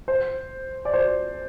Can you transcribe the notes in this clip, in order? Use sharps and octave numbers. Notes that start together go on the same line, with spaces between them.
C5
D5
C5